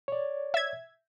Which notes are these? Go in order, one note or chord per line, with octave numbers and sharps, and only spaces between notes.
C#5 D5
E5 G#6